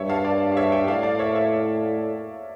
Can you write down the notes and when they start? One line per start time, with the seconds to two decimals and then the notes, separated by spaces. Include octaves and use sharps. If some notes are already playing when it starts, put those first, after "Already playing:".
Already playing: G2 C#5 E5
0.09 F5 A5
0.25 D5 F5
0.52 F5
0.57 C#5 E5
0.72 E5 G5
0.87 A2 D5 F5
1.03 D5 F5
1.19 C#5 E5
1.35 C#5 E5